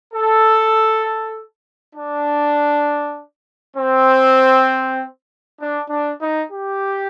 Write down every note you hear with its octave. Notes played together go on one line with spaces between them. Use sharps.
A4
D4
C4
D4
D4
D#4
G4